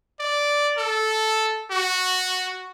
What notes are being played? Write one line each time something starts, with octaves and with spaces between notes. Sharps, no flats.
D5
A4
F#4